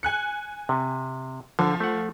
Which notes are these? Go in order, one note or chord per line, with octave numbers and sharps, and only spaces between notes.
G#5 F#6 C#7
C3
D3 F3
A3 F#5